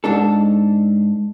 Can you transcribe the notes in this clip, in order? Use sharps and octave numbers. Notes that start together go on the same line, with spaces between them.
G#2 D4 A4